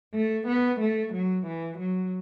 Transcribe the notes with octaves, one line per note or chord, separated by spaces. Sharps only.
A3
B3
A3
F#3
E3
F#3